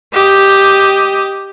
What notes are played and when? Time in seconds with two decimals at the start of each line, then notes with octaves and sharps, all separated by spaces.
0.14 G4 D#5